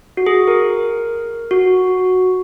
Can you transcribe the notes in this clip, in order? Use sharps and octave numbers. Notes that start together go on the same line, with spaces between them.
F#4
G#4
A#4
F#4